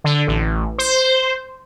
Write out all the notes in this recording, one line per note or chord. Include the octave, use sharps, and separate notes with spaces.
D3
A1
C5